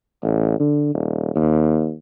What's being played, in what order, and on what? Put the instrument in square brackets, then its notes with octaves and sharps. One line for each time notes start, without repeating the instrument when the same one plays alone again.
[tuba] A1
D3
D#1
D#2